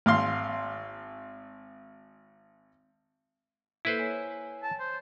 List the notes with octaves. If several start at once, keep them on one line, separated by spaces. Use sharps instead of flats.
G#1 F5 C6 F6
A#3 E4 A4 B4 C5
C#5 G#5
A5
C5